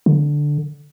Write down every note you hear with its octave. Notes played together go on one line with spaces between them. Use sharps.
D3